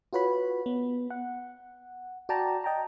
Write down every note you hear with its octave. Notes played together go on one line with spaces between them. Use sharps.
F4 F#4 B4 C#5 B5
B3
F#5
F#4 D5 G5 A5 A#5
D#5 G5 A5 A#5